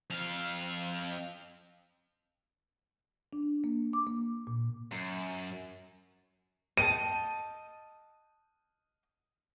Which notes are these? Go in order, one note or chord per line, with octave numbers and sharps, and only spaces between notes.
F2 F5
D4
A#3
D6
A#3
A#2
F#2
D#5 G5 A5 D#7